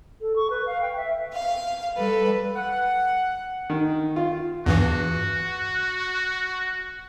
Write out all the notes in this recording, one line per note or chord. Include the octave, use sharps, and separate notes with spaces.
A4
C#6
B4
F5
G5
E5
F5
G3 A4 B4
F#5
D#3
F4
E2 G2 E3 F#4